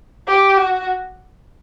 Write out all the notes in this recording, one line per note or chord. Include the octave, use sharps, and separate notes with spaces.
G4
F#4